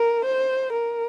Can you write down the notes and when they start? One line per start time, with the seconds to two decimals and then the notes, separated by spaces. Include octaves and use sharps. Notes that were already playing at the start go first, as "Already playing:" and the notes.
Already playing: A#4
0.25 C5
0.73 A#4